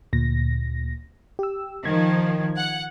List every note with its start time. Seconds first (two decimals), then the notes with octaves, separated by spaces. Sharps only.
0.13 D2 A#2 A#6
1.39 G4 E6
1.85 D#3 F3 G#6
2.57 F#5